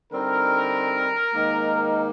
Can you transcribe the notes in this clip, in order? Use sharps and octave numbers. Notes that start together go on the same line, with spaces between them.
D3 G3 C4 D#4 A#4
G#2 D#3 A#3 D#4